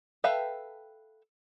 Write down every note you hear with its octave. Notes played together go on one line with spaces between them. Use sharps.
A4 B4 E5 F5 G5